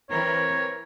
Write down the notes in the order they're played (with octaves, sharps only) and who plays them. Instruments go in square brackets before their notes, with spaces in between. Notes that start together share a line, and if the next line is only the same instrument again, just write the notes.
[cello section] E3 C4 A#4 [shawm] C#5